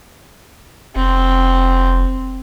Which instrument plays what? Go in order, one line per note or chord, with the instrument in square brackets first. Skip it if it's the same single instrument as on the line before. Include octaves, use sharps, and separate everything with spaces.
[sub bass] F1 [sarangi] C4